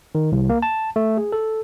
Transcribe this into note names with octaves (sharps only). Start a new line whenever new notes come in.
D#3
C2
A#3
A5
A3
G#4
A4